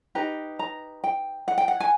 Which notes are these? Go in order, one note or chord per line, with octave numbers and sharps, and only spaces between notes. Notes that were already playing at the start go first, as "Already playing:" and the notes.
D#4 G4 B4 A#5
A#5
G5
F#5
G5
F#5
G#5